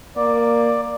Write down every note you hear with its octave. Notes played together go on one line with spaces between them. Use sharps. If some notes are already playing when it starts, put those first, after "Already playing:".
A#3 D5